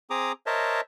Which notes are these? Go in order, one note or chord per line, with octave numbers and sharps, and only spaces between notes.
C4 G#4 A#5 D6 D#6
A#4 C5 C#5 D#5 E5 A5